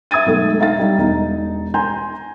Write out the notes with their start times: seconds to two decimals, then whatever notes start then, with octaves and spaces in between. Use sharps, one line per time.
0.11 E5 D#6 G#6 A6 D#7
0.26 B1 G#3 A3
0.59 D#4 E5 F5 A6
0.78 G3 D#4
0.98 E1 D#4
1.74 G#5 A#5 C6 G6